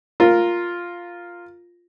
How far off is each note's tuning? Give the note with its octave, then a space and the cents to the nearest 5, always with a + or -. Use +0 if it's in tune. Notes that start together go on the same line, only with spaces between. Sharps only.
F4 +0 A#4 +0